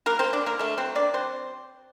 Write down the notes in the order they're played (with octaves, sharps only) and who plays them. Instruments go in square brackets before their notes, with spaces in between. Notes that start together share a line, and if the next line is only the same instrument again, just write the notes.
[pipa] F#3 A#3 A#4
C4 C5
A#3
D4 D5
D3 A#3 A#4
D3 A3 A4
F#3 C4 C5
A#3 D4 D5
F#3 C4 C5